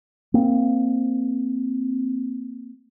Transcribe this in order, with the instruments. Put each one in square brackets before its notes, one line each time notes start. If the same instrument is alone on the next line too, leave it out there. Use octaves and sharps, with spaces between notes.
[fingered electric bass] A#3 C4